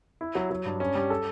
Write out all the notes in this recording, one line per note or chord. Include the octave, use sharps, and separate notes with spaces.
E4
F#3
F#3
G2
C#4
G3
A4